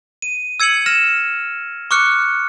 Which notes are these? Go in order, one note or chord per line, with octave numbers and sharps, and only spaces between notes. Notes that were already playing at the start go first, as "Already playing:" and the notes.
D#7
E6 G#6 C#7 D#7 F#7
F6 A#6 E7
C#6 D6 F6 F#6 C#7